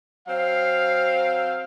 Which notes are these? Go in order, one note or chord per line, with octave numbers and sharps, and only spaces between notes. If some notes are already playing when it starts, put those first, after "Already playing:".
F#3 C4 F5